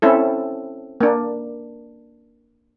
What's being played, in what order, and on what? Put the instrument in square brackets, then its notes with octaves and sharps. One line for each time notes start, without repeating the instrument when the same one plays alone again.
[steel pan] C4 C#4 E4 A4
A#3 D4